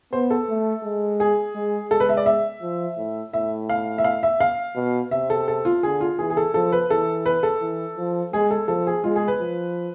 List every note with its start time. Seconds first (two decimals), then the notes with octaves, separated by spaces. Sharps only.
0.13 B3 C5
0.30 A4
0.49 A3
0.83 G#3
1.20 G#4
1.55 G#3
1.91 G#3 A4
2.00 B4
2.09 E5
2.17 D5
2.26 E5
2.62 F3
2.97 A2
3.33 A2 E5
3.69 F5
3.98 E5
4.04 F5
4.23 E5
4.40 F5
4.76 B2
5.11 C3 E5
5.30 A4
5.48 A4
5.65 F4
5.83 D3 G#4
6.01 F4
6.19 E3 G#4
6.30 G#4
6.37 A4
6.54 F3 A4
6.72 B4
6.90 E3 A4
7.26 B4
7.43 A4
7.61 E3
7.98 F3
8.33 G#3 G#4
8.51 A4
8.68 F3 A4
8.87 G#4
9.04 G#3 F4
9.16 G#4
9.28 B4
9.40 F3